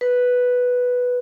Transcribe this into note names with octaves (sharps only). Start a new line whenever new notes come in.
B4